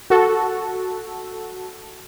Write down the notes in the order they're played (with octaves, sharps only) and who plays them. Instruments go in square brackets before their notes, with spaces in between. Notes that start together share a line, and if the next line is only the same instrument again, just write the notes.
[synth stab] F#4 A4